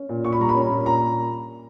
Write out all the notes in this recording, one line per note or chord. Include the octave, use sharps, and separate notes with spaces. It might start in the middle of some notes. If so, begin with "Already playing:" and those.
Already playing: C#4
A#2
A#2 C#6
B5
G3 A#5
B5
C#4
A#2
A#2 A#5